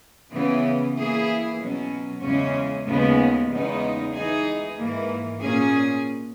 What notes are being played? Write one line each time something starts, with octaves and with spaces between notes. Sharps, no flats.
C#3 E3 B3
E3 A#3 E4 G#4
B2 F#3 C#4
E2 C#3 G#3 C#4
D#2 C#3 G#3 B3
E2 C#3 G#3 B3 D#4
E3 G#3 D#4 G#4
G#2 E3 A#3
A#2 A#3 C#4 G#4